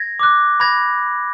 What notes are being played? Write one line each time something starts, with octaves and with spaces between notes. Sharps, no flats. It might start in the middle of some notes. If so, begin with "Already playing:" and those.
Already playing: G#6 A#6
D6 F#6
B5 G#6 A#6